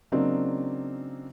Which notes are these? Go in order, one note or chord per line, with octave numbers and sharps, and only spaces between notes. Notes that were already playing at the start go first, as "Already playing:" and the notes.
C#3 F#3 A#3 C4 D4 D#4